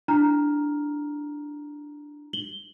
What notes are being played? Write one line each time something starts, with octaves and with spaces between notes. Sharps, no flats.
D4 E4 A#5 F6
F#7 G7